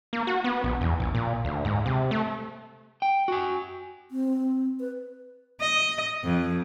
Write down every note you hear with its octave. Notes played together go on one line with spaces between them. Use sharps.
A#3
F#4
B3
A#1
E2
A#1
A#2
D2
G#2
C3
A3
G5
F#4 G#5
C4
B4
D#5
F2